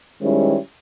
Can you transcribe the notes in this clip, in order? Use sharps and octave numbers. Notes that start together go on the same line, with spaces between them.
D#3 G3 G#3 C#4 E4 C5